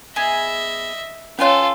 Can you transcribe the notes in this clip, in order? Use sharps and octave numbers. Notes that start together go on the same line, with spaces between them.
B3 G#4 D#5 E5
C#4 F4 A4 B4 C#5 G#5 C6